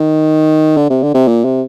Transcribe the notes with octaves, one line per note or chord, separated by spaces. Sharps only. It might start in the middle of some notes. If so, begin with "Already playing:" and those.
Already playing: D#3
D3
C3
D3
C3
A#2
C3